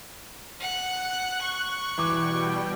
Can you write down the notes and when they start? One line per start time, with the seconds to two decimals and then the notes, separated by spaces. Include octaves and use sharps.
0.60 F#5 F#6
1.41 C#6
1.98 B2 E3 G3 G5 D6